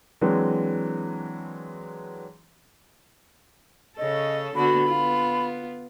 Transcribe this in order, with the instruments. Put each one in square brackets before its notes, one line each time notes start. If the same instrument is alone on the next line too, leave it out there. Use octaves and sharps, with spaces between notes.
[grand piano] E3 F#3 G#3 C4 D4
[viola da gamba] C#3 C#4 A4 [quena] D#5
[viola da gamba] D3 B3 F#4 [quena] B5
[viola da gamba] B3 F4